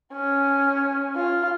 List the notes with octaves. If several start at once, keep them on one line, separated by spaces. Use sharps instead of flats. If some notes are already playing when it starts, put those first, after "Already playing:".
C#4
F4